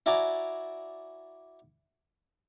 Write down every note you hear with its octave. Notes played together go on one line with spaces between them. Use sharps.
E4 F#4 D5 G#5 A#5 D6